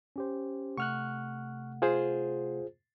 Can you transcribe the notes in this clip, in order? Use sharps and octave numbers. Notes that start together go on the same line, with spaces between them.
C#4 G4 C5
C3 A3 F#5 C#6 F6 F#6
F4 G#4 C5